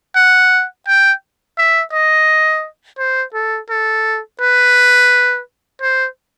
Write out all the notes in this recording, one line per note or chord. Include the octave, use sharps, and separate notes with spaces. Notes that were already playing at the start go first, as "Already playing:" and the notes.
F#5
G5
E5
D#5
C5
A4
A4
B4
C5